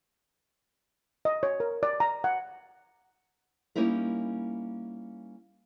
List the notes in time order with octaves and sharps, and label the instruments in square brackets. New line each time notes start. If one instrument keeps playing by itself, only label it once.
[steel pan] D#5
C#5
A#4
D5
A#5
F#5
[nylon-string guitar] G3 A#3 C#4 D#4 E4 A#4